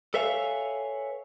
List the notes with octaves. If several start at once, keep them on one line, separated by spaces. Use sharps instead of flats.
A4 B4 C#5 E5 F5 G#5